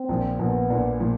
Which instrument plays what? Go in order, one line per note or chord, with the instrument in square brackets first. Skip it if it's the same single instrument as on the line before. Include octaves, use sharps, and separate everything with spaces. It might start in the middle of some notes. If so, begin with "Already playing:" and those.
Already playing: [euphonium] C4
[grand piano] A#1 A#2 F3
[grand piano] A#1 A#2 F3 [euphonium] B3
[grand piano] A#1 A#2 F3
A#2 F3